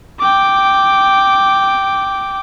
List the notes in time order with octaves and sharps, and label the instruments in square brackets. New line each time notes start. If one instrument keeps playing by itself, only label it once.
[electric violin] G5 D6